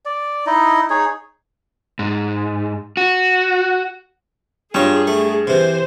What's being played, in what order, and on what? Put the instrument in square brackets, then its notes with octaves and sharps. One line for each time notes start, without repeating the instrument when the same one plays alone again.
[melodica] D5
D#4 E4 D#5
D#4 G#4 C#5
[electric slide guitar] G#2
F#4
[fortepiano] G2 [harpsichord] F4 C#5 [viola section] G#4
[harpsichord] A3
[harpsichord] C3 E3 [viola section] C5